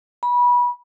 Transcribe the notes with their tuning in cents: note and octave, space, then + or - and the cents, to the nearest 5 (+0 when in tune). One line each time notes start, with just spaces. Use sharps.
B5 -25